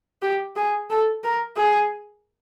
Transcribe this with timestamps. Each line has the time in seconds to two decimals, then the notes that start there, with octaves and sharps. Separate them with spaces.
0.22 G4
0.56 G#4
0.90 A4
1.23 A#4
1.57 G#4